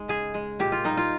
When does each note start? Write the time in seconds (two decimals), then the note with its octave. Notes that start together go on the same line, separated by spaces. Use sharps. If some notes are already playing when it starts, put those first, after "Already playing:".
Already playing: G#3 D#4
0.08 C#3 G#4
0.34 G#3
0.59 A#2 G4
0.72 F4
0.84 G3 D#4
0.97 F4